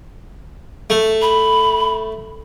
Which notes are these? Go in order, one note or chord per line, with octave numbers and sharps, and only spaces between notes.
A3
B5